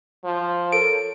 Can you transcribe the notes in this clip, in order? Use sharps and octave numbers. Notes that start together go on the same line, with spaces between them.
F3
A4 A#4 C#5 D7